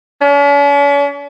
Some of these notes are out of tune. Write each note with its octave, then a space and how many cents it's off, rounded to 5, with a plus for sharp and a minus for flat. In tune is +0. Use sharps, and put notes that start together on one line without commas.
C#4 +45